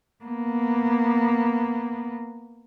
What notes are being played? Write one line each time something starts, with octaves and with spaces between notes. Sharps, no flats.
A#3 B3